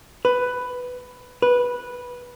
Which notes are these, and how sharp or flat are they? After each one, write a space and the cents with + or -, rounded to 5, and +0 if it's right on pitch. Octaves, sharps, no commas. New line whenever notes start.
B4 +10
B4 -10